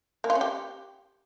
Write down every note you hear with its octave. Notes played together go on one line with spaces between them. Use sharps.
A#3
F4
C#4
G4